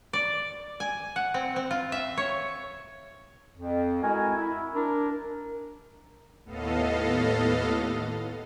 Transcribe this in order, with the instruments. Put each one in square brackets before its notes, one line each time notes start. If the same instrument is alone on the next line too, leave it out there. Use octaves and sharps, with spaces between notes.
[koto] D5
G#5
F#5
C4
C4
F4
E5
C#5
[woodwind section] F2
G#3 E4 F#4 A#4 G#5
E4
D4 A#4
[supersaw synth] D#2 A2 B3 A4 D#5 F5